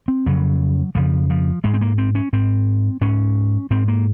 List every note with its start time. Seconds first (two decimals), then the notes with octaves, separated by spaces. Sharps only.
0.08 C4
0.26 F2 C#3 F#3
0.95 F2 C#3 F3
1.30 F3
1.64 G#2 G#3
1.74 C4
1.81 A#3
1.98 C4
2.15 C#4
2.33 G#2 C4
3.01 G#2 C#4
3.70 G#2 C4
3.88 A#3